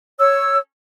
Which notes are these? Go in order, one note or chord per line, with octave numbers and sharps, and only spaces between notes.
C#5 E6